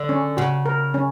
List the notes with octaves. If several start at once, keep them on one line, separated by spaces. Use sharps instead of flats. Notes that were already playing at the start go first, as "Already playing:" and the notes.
Already playing: D3
C#4
C#3 F#4
A#4
C#4